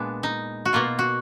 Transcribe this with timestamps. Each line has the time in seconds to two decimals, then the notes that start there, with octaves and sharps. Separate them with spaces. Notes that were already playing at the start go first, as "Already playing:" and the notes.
Already playing: A#2 G#3 B3 D4
0.23 D#4
0.65 F#4
0.73 B2 A#3 F4
0.99 F#4